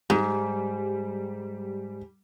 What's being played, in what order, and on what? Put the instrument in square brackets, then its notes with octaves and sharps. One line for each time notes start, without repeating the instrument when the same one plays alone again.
[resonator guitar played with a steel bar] G#2 [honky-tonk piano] G3